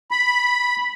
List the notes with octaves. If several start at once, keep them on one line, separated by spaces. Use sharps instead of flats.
B5